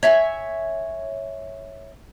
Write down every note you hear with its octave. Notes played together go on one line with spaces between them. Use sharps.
C#5 E5 G#5